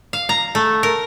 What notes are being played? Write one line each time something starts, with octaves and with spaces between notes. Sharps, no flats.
F5
A#5
A3
A#4